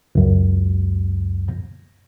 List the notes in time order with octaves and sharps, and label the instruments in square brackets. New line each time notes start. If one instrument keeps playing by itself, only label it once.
[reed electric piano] C#2 F#2